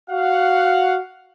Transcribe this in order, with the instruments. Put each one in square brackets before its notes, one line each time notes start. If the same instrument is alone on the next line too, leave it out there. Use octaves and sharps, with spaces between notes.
[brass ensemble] F#4 F5 F#5